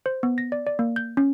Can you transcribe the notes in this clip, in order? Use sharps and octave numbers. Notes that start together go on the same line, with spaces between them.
C5
B3
A#6
D5
D5
A#3
G6
C#4